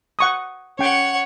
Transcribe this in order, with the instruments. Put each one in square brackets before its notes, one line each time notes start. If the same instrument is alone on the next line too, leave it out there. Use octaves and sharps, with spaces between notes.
[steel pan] F#5 C#6 D#6
[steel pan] C#4 G5 [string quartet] C#5 F#5